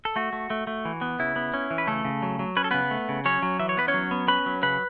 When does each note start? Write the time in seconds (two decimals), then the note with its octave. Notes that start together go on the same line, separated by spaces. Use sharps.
0.05 A4
0.16 A3 F#4
0.33 A3
0.50 A3
0.67 A3
0.85 E3
1.01 B3
1.19 C#3 E4
1.36 B3
1.54 C#4
1.71 E3
1.78 B4
1.87 C#3 A3 A4
2.04 C#3
2.22 F#3
2.39 F#3
2.57 C#4 B4
2.64 A4
2.71 C#3 B3 B4
2.91 A3
3.09 C#3
3.25 F#3 C#4 C#5
3.42 F#3
3.59 E3 E5
3.69 C#5
3.77 B3 B4
3.88 C#4 C#5
3.94 F#3
4.11 B3
4.28 C#4 B4 B5
4.46 F#3
4.62 C#3 B4 B5